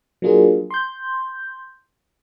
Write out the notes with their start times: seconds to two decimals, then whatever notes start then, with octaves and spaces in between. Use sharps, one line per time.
0.22 F#3 A#3 D4 F4 G#4 A#4
0.71 C6 G6